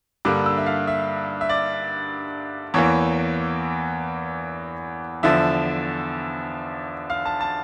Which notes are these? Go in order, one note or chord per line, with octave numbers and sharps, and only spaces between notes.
G2 D3 G3 A#3 D6
E6
E5
F5
E5
E5
D5
E2 E3 A#3 C#5
E2 D3 F3 E5
F5
A5
A5